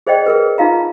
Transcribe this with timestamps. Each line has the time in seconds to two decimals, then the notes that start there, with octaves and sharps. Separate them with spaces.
0.07 G#4 C5 D5 D#5 G5
0.26 G#4 A#4 B4
0.58 D#4 F4 F5 A#5